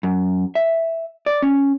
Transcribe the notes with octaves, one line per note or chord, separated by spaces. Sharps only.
F#2
E5
D5
C#4